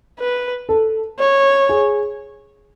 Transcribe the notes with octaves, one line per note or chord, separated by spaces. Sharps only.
B4
A4
C#5
G#4